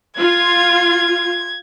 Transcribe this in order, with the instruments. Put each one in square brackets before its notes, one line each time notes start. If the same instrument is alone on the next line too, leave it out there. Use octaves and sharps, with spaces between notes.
[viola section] F4 [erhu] G#6